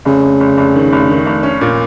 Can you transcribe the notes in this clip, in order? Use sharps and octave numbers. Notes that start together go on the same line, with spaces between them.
F1 C#3
F1
F1
F1
D#3
F1
D#3
F1
C#4
A#2